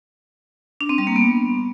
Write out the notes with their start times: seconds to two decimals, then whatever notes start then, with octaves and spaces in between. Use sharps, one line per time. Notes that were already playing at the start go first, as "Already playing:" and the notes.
0.81 D4
0.89 C4
0.98 G3
1.07 A#3
1.16 B3